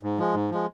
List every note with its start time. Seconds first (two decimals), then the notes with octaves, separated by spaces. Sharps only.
0.03 G#2
0.18 F3 G#3
0.34 G#2
0.50 F3 G#3